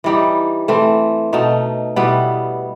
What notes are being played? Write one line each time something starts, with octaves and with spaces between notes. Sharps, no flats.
E3 G3 D#4
E3 A3 C4
B2 A3 D#4
B2 G3 B3 E4